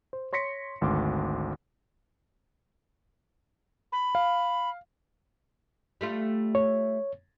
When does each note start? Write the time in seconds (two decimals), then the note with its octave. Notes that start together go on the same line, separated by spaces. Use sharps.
0.13 C5
0.33 C#5 C6 A#6 B6 C#7
0.81 G#1 D2 C6 D6
3.92 B5
4.15 F5
6.01 G3 A3 F4
6.55 C#5